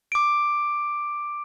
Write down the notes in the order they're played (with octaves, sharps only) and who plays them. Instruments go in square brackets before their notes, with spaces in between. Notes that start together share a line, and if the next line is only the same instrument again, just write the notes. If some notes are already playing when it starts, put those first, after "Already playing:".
[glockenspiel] D6 D7